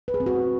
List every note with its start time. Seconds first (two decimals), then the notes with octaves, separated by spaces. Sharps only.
0.08 B4
0.14 G#4
0.20 C4
0.26 F#4